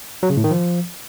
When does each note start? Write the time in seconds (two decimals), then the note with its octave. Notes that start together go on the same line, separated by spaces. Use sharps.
0.23 F#3
0.30 C#3
0.37 A2
0.44 D#3
0.51 F3